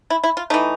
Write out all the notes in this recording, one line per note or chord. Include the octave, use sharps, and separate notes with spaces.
E4
E4
F4
E3 A3 D#4